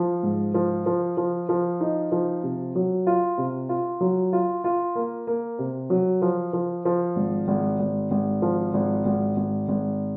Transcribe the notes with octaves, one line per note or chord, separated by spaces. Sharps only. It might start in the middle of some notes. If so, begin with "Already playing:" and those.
Already playing: F3
G#2
F3
F3
F3
F3
D#4
F3
C3
F#3
F4
C3
F4
F#3
F4
F4
A#3
A#3
C3
F#3
F3
F3
F3
G#1
G#1
G#1
G#1
F3
G#1
G#1
G#1
G#1